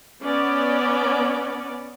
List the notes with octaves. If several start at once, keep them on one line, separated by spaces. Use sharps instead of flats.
B3 C#4 D5